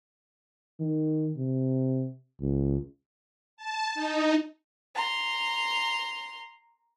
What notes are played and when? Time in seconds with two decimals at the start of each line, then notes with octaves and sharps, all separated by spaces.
0.80 D#3
1.37 C3
2.40 C#2
3.57 A5
3.95 D#4
4.94 A#5 C6